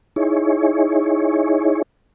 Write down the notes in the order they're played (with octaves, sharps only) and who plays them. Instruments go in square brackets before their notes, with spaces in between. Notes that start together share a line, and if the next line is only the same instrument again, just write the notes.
[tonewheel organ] D#4 E4 G#4 C#5